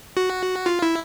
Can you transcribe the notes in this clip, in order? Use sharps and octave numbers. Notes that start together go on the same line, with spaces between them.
F#4
F4
E4